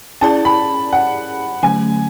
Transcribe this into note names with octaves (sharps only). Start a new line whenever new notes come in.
C#4 E4 G#4 D5 A5
B5
F#5
D3 F#3 A3 C#4 G#5